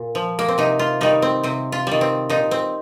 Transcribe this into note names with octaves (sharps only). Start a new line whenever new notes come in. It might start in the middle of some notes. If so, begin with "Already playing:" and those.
Already playing: A#2
F3
A#3
C4
C3 D#4
F4
D#3 G3 D#4
C4
C3 C4
F4
D#3 G3
C4
A#2 D#4
C4